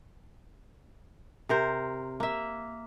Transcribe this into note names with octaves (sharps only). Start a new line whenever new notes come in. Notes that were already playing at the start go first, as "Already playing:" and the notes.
C3 A#4 C5
A#3 E5